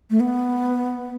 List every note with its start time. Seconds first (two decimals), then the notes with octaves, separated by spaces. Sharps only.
0.10 A3
0.20 B3